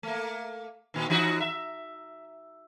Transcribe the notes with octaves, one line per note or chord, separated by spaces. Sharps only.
A3 A#3
A#2 D#3
E3 D#4 F#4
E5